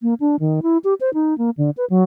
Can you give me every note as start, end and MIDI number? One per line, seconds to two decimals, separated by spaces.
0.02 0.14 58
0.20 0.36 62
0.40 0.60 51
0.62 0.77 64
0.84 0.94 67
1.00 1.10 72
1.14 1.36 63
1.38 1.50 58
1.57 1.70 50
1.77 1.85 71
1.90 2.03 54